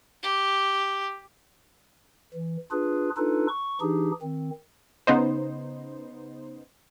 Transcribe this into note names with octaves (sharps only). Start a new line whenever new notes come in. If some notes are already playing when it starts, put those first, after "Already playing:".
G4
E3
D4 F4 G#4 B4
D4 D#4 F4 A4 B4
C#6
E3 D4 D#4 G4 G#4
D#3 C4
C#3 B3 D#4 C5